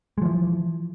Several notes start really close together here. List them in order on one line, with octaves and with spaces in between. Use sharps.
G#3 F3 E3